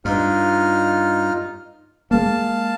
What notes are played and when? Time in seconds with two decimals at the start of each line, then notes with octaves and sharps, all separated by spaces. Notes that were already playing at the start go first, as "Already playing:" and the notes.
0.05 G2 D#4 F4 F6
2.11 G#3 A#3 F5 A5